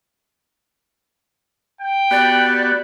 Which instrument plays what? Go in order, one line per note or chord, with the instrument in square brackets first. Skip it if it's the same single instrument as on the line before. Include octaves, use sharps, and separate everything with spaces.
[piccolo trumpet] G5
[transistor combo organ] B3 F#4 G4 [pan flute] D5